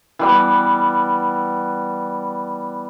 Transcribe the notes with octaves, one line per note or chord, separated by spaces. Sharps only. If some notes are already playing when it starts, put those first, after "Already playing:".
E3 G3 B3